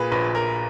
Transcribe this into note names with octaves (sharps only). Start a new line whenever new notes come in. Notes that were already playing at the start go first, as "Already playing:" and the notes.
Already playing: A#2 G#4 B4
A#1 B4
A#4